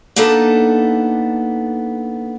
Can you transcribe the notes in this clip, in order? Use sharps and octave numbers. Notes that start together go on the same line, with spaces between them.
A#3 B3 D4 D#4 A4